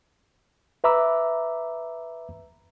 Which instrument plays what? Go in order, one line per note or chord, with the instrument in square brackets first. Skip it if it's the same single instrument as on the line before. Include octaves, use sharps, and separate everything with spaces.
[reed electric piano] B4 E5 A#5 B5 D6 E6